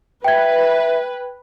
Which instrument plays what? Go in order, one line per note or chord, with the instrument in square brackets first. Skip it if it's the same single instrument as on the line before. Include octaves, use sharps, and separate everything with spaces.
[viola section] B4 [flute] E5 [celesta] G5 G#6